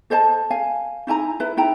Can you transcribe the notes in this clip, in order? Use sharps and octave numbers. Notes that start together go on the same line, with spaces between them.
A4 C5 D#5 A5
F5 G#5
D#4 E4 G#5 A#5
E4 B4
D#4 E4 G5 A#5